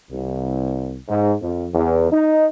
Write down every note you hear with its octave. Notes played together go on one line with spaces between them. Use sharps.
C2
G#2
F2
E2
D#4